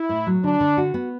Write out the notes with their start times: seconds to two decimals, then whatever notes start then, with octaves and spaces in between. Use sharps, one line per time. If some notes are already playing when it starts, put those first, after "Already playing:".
Already playing: E4
0.09 A2
0.27 F#3
0.44 D3 D4
0.60 D3
0.77 F#4
0.94 B3